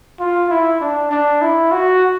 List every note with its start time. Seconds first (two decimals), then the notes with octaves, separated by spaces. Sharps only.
0.20 F4
0.50 E4
0.81 D4
1.11 D4
1.41 E4
1.71 F#4